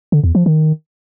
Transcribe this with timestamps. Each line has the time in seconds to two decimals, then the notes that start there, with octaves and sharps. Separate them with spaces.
0.12 D3
0.24 E2
0.35 F3
0.46 D#3